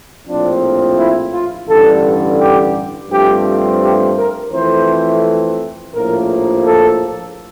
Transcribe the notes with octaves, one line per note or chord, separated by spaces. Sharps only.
A#1 A2 F3 C4 D4
E4
F4
A1 G2 D3 A4
G4
G2 F3 A3 C4 G4
G4
A#4
F2 E3 A3 C4 C5
A#1 A2 F3 A#3 A#4
A4